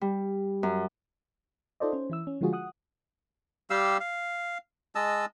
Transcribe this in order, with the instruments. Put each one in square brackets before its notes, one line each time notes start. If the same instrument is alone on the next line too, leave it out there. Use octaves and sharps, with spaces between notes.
[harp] G3
F#2
[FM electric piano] D#4 F4 A4 C5 D5 D#5
C#4 C5
E3 E4 E6
C#4
D3 F3 G#3 F4 F#4 G#4
F#5 D#6 F#6
[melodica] G3 G4 F5 E6
F5
G#3 D#5 A5 E6